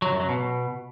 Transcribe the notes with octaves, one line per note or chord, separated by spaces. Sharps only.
F#3
F#2
F#3
B2